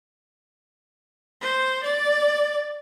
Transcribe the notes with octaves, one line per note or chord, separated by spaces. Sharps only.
C5
D5